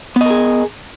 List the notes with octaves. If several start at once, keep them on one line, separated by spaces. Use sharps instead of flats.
B3 G#4 A#4 D#5